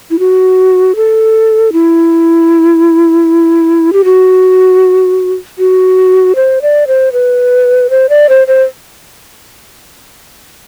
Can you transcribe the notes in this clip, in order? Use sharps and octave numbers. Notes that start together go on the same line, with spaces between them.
E4
F#4
A4
E4
G4
F#4
F#4
C5
D5
C5
B4
C5
D5
C5
C5